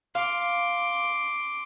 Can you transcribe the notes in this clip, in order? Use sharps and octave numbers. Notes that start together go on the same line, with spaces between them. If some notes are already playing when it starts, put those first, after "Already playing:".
F5 C6 D6